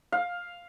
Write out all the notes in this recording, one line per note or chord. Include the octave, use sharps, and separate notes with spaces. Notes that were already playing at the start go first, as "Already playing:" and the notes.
F5